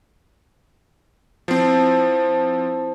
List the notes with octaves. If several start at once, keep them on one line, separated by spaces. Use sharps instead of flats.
F3 C4 E4 C5 A5